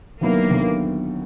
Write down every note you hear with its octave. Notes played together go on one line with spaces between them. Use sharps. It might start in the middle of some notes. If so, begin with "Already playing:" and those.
D#2 D3 F#3 A#3 B3 E4
D#2 D3 F#3 B3 E4